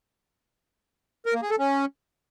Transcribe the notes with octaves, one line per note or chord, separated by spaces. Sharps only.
A#4
A#3
G#4
A4
C#4